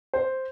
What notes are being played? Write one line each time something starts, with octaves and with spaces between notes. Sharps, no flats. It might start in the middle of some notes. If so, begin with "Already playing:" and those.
C5